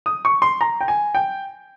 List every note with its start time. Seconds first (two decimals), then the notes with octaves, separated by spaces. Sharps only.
0.06 D#6
0.25 C#6
0.42 C6
0.61 A#5
0.81 G5
0.88 G#5
1.15 G5